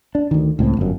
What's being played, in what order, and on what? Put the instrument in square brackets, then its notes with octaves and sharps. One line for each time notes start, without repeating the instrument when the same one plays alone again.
[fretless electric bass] D4
D2 D#3
C#2 A2 G3 C4
G1 F#2